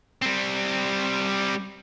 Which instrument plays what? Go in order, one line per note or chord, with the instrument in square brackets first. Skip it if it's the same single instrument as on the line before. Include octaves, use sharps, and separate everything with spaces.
[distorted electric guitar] G3 C4